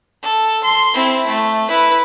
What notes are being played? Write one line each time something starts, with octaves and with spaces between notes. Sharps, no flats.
A4
C6
C4 E4
A3
E4 B4